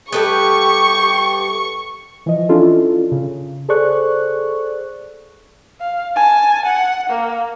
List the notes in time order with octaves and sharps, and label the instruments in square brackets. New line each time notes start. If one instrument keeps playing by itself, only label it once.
[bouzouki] G3 A3 B3 [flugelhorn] G4 [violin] C#6
[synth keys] E3 F3 D#5
C#4 D4 E4 F4 A4
C#3
G#4 A4 C5 D5 C#6 F#6
[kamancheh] F5
G#5 A5
F#5
A#3